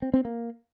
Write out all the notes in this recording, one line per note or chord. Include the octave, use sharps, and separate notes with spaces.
C4
C4
A#3